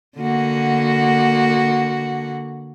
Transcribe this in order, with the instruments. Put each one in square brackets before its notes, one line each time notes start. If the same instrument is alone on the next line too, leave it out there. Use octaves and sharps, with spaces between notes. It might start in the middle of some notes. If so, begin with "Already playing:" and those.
[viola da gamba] D3 A#3 F#4